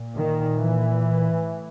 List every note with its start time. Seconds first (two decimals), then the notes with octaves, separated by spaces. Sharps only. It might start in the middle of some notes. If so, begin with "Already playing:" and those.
Already playing: A#2
0.16 D#3
0.57 E3
1.40 A2